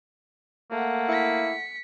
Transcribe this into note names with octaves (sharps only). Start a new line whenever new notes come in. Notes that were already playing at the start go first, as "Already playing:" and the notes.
A3 A#3 F#5
E4 B6 C#7